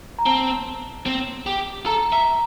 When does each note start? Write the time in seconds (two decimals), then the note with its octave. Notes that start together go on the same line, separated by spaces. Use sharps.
0.19 A#5
0.26 C4 A5
1.06 C4
1.47 G4
1.86 A4 A#5
2.12 E5 A#5